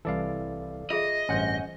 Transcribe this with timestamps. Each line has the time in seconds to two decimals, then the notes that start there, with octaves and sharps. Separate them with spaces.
0.05 C2 E3 A4 D5 F5
0.90 F4 G#4 D#5 E5
1.29 A1 G2 C#4 C5 F#5 C6 G6